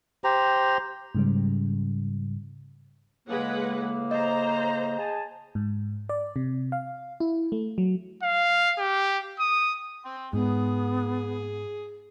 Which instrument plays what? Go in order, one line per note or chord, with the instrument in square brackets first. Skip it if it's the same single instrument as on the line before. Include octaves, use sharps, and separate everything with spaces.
[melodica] G4 C5 A#5
[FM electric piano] G#2 C#3 G3
[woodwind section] A2 C#3 A#3 [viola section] G#3 B4 F#5
[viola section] C5 A#5 [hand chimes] D#5
[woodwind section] G#4 G#5 A5
[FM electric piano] G#2
D5
C3
F5
E4
A3
F#3
[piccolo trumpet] F5
G4
D#6
[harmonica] G5 C6
[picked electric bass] G#2 [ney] B3 [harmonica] G#4